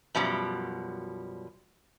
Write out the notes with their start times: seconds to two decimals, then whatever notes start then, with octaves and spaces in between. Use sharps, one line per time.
0.15 F#2 B2 F3 G3